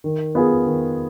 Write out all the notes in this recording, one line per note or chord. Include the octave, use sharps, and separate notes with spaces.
D#3
B3 F4 G#4
D#3